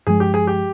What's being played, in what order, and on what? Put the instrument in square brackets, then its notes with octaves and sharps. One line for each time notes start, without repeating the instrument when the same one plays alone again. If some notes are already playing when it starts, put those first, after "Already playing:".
[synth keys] G2 F3 G#3 [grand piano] G#4
[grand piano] G4
G#4
G4